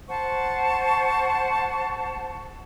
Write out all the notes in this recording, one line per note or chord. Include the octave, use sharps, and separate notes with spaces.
C5 F#5 A5 C#6